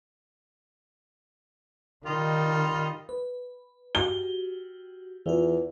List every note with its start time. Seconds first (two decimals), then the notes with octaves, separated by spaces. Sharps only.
2.06 D#3 G3 F4 D#5
3.09 B4
3.95 F#4 G4 G7
5.26 E2 E3 F4